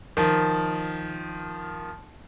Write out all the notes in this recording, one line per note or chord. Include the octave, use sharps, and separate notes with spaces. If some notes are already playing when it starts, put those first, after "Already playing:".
D#3 F3